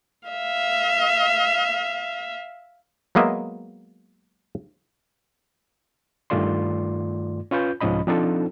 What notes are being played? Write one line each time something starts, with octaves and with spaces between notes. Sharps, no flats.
E5 F5
F#3 G#3 A#3 B3 D#5 E5
G2 D#3 A3 F4 D5 C6
C#4 F4 B4 G6
C2 G#2 F3 C#4 D#5 B5
F3 C4 D4 D#4 F4 A4